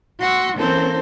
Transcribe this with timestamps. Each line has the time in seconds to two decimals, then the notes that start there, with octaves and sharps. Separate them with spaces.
0.19 F#4 F#5 C6 C#6 E6
0.56 E3 A#3 C4 C#4 A4 C5